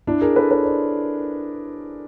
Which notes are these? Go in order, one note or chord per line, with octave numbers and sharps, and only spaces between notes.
D4 E4
G#4 A#4
A4 B4
B4 C#5
C5 D5